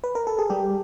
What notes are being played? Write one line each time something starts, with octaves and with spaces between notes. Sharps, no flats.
B4
A#4
A4
G#4
G3 G4